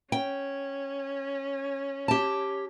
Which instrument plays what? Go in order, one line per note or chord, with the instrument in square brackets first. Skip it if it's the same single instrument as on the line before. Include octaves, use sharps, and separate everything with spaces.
[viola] C#4 [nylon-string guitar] G5
[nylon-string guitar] G4 A5